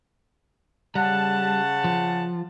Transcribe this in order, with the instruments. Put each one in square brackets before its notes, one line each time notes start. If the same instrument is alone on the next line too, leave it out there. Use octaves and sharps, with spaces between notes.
[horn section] C#3 F#5 A5 [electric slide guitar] G3
[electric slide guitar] F3